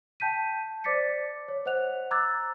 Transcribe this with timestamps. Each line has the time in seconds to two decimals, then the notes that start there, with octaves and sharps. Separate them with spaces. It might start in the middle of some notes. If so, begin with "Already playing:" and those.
0.20 G5 A5 G6 B6 D#7
0.84 C5 D5 D6 A6 B6 C#7
1.48 C#5
1.66 C5 D#5 F#5 F#6 F7
2.11 A#5 D6 E6 F#6 G#6 A6